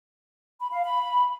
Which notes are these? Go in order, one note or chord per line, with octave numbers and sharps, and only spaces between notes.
B5
F5
B5